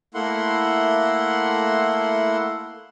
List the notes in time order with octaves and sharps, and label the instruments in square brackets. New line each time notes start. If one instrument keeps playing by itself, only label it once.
[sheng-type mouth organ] A3 A#3 E4 F#5 C6